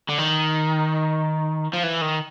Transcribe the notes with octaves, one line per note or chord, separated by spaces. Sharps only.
D3
D#3
F3
E3
D#3